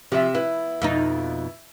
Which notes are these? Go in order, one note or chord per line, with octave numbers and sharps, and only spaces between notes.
C3 F3 E5
B3 E4
F2 B2 D#4